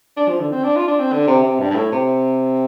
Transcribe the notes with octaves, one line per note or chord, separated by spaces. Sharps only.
D4
F3
D3
C4
D4
F4
D4
C4
D3
C3
C3
G2
G2
A2
C3